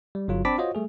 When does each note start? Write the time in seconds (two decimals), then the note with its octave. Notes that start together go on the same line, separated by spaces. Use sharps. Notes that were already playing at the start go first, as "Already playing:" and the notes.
0.15 G3
0.28 G1 F#3 F4
0.45 C4 D4 A5 B5 D6 B6
0.58 F4 F#4 C5 C#5 D#5
0.75 G3 A3 G#4